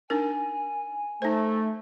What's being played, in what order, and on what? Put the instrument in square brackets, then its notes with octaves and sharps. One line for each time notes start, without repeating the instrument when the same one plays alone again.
[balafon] D4 D#4 A#4 [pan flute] G#5
[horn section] A3 [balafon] D#4 C5